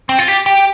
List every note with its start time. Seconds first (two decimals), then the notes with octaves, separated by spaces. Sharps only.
0.09 C4
0.19 F4
0.28 G4
0.46 G4